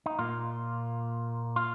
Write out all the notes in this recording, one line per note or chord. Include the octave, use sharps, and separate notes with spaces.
D#4
A#2 A#3 F4
F4